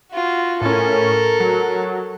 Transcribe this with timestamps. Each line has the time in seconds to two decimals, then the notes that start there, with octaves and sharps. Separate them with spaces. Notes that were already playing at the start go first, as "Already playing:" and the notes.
0.12 F4 F#4
0.61 A2 C#4 A4 A#4
1.40 F#3